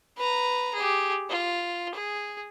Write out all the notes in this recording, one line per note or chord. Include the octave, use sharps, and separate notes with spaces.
B4 A#5
G4 G#4
F4
G#4